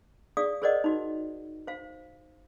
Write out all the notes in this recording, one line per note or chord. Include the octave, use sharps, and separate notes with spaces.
G#4 D5 F5 D#6
G#4 A#4 C5 D5 D#5 F#5
D#4 F#4
C5 F5